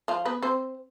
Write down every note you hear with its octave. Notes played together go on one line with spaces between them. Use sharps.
F3 F4
B3 B4
C4 C5